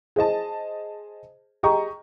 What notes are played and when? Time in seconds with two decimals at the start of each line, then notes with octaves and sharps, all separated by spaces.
0.16 G#4 C5 D#5 A5
1.63 G4 G#4 D#5 A#5 C#6